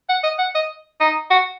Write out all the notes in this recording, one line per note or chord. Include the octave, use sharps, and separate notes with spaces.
F#5
D#5
F#5
D#5
D#4
F#4